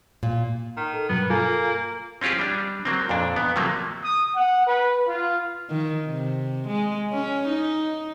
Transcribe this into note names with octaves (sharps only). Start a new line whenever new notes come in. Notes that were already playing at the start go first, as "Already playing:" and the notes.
A#2
D#3
A4
G2 B2 F#3 B3
A#3 F4 A4 G#5
C4 C#4 F4 G4 G#4
G3 D4
F#3 A#3 C4
F2 A#2 D4
B3
C3 F3 F#3 A3 A#3
D#6
F#5
B4
F4
D#3
C3
G#3
C#4
D#4